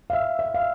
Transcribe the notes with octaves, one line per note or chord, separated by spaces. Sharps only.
F5
E5
E5
F5